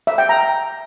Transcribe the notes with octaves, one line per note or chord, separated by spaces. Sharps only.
E5
G5
A#5